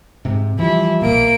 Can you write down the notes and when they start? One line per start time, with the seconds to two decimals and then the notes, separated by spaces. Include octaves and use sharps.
0.25 G#2 C3
0.59 E3 F3 G3 E4
1.02 B1 A#2 A#3 D7